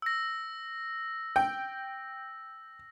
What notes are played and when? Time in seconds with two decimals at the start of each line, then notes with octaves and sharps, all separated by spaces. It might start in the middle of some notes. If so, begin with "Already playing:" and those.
0.02 E6 A#6
1.36 G5